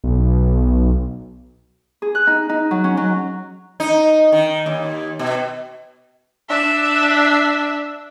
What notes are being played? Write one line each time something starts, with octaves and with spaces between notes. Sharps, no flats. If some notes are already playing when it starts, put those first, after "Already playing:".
B1
G#4
F#6
D#4
D#4
F#3
C#4
F#3
D#4
D#3
D#2
B2
D4 E5